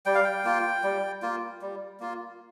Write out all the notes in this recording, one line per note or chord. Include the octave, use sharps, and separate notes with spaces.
G3 G5
F5
G5
A#3 F4
G3
A#3 F4
G3
A#3 F4